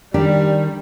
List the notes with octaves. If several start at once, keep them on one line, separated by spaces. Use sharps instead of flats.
D#3 G3 D4 G4